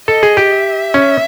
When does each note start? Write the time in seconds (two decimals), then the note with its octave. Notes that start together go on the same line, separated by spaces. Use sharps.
0.08 A4 D#5
0.23 G#4
0.37 G4
0.51 E5
0.94 C#4